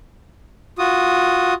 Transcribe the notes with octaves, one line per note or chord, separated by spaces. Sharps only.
F4 F#4 D#6